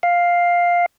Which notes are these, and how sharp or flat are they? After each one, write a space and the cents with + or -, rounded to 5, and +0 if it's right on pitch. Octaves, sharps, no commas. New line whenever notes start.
F5 +5